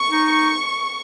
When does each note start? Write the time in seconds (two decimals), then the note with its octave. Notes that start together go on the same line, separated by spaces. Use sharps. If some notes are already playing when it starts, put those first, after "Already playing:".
Already playing: C#6
0.11 D#4